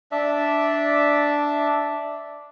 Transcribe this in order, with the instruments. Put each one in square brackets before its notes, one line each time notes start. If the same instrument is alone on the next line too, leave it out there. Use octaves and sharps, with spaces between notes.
[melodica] D4 D5 E5 A5